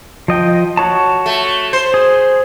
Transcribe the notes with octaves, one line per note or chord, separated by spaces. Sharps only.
F3 D#5 G5
F#4 C#5 A5
A3
C5
G#4